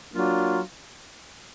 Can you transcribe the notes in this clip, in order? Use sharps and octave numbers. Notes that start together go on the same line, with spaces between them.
F#3 A#3 D4 F4